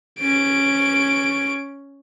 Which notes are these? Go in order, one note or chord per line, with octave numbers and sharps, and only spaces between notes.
C#4 D7